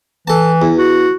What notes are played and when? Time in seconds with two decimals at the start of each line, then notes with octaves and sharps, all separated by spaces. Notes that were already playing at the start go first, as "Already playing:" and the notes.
0.28 E3 A4 A5
0.62 E2
0.78 F#4